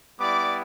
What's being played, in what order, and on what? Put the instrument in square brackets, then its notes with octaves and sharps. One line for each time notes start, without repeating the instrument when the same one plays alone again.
[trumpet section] G3 B3 E4 D5 D6